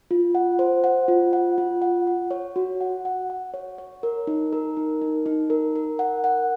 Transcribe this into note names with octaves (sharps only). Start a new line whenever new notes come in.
F4
F#5
C5
F#5
F4
F#5
F4
F#5
F#5
C#5
F#4
F#5
F#5
F#5
C#5
C#5
A#4
D#4
A#4
D#4
D#4
D#4
A#4
A#4
F#5
F#5